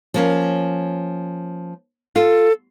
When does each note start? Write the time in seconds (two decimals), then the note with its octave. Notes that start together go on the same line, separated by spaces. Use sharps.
0.14 F3 A#3 C#4
2.16 F4 A4